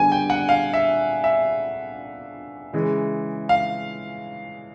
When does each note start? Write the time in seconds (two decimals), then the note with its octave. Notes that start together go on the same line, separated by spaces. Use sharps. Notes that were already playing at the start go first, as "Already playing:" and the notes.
Already playing: D3 G3 B3 G#5
0.12 G5
0.30 F#5
0.49 F5
0.73 E5
1.24 E5
2.73 C#3 E3 G#3
3.49 F5